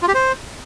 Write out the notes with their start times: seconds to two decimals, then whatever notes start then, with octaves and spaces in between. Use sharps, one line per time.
0.02 F4
0.08 G4
0.14 C5